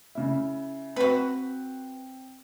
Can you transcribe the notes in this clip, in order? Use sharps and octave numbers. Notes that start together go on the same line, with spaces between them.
C#3 E4
C4 F#4 B4